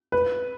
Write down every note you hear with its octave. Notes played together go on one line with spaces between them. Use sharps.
B4